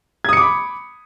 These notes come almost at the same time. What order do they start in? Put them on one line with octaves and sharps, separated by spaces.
G#6 D#6 C#7 D6 B5